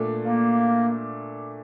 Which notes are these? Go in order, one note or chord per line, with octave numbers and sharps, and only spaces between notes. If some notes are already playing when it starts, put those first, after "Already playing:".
Already playing: A#2 A3 D4
A#3